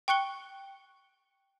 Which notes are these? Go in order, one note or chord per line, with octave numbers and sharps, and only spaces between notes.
G5 C#6 F#6 C#7 G7